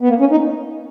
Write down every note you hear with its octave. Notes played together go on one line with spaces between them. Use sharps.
B3
A#3
C#4
D#4